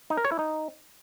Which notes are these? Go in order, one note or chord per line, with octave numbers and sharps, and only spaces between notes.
D#4
A#4
C#5
E4
D#4